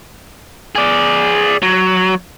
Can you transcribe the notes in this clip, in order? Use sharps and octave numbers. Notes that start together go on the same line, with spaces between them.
G#4 D5
F#3